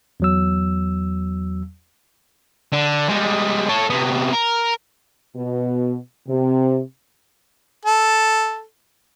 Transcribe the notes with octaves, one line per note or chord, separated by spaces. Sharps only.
E2 F#3 E6
D3
G3 G#3
A4 C#5
C3 B3
A#4
B2
C3
A4